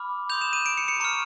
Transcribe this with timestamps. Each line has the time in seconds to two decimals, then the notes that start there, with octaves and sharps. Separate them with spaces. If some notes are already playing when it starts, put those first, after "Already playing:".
Already playing: B5 D6 F6
0.30 C6 D#6 G6 F7
0.41 E7
0.53 D#7
0.66 D7
0.77 C#7
0.88 C#7
1.00 A#5 C#6 F6 C#7